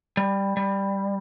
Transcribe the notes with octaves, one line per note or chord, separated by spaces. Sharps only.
G3
G3